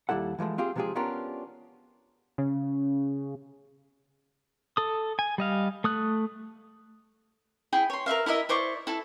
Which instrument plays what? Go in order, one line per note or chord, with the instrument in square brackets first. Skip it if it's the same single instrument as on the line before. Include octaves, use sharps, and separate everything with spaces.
[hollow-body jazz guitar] D#2 G3 E4 A4 F#5
E3 F3 G#3 A3
C4 F4 G4 G#4
C3 F3 G#3 F4 G4 G#4
B3 C#4 D4 F4 G4 A#4
[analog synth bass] C#3
[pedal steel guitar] A4 D#6
G#5
G3 D#5 F5
A3 D#6 F#6
[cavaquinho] E4 G#4 G5
C#5 C6
A#4 B4 E5 F5
E4 A#4 D#5 E5
E4 C5 D5 C#6
E4 A4